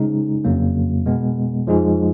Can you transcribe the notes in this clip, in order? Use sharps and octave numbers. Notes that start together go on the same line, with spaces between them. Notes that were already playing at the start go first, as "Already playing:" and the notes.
Already playing: C#3 G#3 D#4
F2 C#3 F#3 A#3
B2 G#3 B3
F2 F3 G#3 D#4 G#4